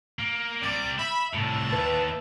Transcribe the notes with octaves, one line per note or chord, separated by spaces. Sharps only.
A#3
C3 G3 D5
E5 B5
C2 A2 D4 E5 A5
D#2 B4